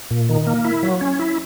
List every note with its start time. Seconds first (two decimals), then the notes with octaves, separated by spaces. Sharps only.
0.11 A#2
0.29 D#3
0.47 A#3
0.65 E4
0.83 F#3
1.01 C#4
1.19 E4